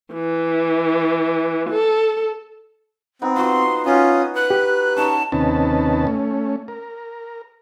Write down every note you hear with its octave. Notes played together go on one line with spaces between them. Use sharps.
E3
A4
B3 C4 D#4 B4
F4 F#4 C6
C#4 F4 F#4 F#5 D#6
B4 F#6
G4
C#4 D#4 C#5 A5
D#2 C3 C#4 D#4 B4 A5
A3 C#4
A#4